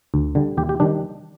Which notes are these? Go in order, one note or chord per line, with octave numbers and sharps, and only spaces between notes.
D2
D3 G3
D#2 G4
G4
D#3 G3 D4